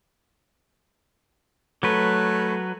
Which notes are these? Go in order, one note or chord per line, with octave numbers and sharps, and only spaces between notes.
F#3 A3 B4